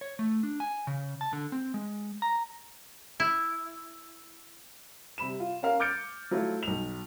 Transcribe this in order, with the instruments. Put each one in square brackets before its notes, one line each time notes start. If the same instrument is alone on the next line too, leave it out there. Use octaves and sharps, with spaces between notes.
[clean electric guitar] C#5
A3
D4
G#5
C#3
A5
D3
C4
G#3
A#5
[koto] E4
[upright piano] C3 G3 B5 E7
F4
C#4 A#4 F5
D6 F6 G6 A6 C#7 D7
F#3 A3 E4 F4
B1 F7